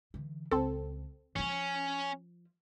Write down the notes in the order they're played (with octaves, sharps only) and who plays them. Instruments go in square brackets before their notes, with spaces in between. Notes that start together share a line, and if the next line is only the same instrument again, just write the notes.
[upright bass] D3 E3
[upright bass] C#2 [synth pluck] C4 A4
[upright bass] F3 F4 [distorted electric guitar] C#4